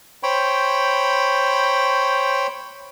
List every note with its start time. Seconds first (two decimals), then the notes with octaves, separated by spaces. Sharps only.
0.23 C5 C#5 G5 B5